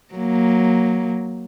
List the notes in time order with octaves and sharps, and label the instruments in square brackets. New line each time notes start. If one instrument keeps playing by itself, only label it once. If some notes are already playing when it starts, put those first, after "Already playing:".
[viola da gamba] F#3 A#3